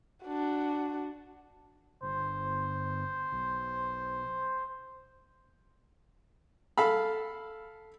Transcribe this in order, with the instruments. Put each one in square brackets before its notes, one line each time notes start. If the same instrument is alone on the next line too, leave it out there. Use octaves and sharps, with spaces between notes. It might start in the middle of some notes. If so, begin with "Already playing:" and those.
[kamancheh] D4 F#4
[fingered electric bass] G1 [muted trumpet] C5
[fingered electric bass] B1
[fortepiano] A4 F5 B5